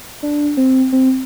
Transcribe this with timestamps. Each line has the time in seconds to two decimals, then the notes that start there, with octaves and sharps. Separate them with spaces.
0.23 D4
0.57 C4
0.93 C4